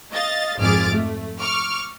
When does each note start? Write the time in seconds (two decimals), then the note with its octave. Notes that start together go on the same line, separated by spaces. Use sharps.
0.13 D#5 F5 A6
0.60 G#1 F2 G#4 D6 F6 A6
0.94 A3
1.39 C#6 D6 F6